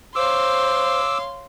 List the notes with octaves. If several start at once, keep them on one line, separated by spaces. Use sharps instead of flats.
C5 C#5 F5 C6 D6 E6